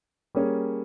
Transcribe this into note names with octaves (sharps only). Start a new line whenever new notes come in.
G3 A#3 C#4 G#4 C#5